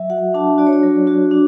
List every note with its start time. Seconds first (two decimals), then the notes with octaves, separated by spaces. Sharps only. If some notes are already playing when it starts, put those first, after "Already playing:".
Already playing: F#3 E5
0.10 F#4 F#5
0.34 D4 A5
0.58 F#4 D5
0.67 C#5
0.73 D5
0.83 F#3
1.07 F#4
1.31 D4